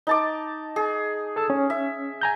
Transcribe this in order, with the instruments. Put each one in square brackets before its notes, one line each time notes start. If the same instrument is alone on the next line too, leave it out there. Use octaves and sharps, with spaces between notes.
[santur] D#4 A5 D6
G#4
[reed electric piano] A4 A5 E6
C#4
[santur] E5
[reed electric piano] G#5 A#5 G6